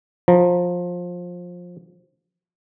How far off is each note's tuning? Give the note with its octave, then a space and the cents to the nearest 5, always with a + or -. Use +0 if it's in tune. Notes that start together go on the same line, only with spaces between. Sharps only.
F3 +20 A#5 +0